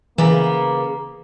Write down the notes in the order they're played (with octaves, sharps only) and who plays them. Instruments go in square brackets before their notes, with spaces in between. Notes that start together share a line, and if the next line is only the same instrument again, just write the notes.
[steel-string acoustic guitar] C#3 B3 [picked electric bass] E3 [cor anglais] A#3